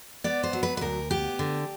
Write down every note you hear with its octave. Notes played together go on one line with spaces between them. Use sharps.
B3 D5
C5
F#3
B4
B4
D2 A#4
B3 G4
D3